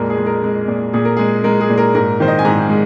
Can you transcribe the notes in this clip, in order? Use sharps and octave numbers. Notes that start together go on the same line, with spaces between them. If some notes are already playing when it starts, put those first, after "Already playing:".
Already playing: F2 A#2 G#3 A#4
G#4
G#3
A#4
G#3
A#2
A#2 G#4
A#4
G#3 G#4
G#3 A#4
G#4
A#2
A#4
G#2 A#4
D#3 C5
D#5
G#5
G#2 A#5
G#5
G#3